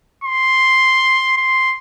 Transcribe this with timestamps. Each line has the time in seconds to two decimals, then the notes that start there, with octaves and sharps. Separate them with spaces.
0.24 C6
1.37 C6